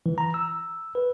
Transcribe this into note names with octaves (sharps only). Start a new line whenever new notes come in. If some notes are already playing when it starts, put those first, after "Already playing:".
E3
A#5
E6
B4